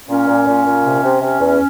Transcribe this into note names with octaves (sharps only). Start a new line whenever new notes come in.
A#2 C#4
A#2
A#2
A#2
C3
C3
C3
E2